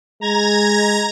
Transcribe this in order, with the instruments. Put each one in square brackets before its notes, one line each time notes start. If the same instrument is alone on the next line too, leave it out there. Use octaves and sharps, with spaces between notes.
[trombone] G#3 [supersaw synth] A#5 G#6 A#6